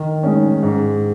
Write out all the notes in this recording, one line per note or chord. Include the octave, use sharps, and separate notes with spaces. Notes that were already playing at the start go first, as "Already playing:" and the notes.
Already playing: D#3
G#3 C#4
G#2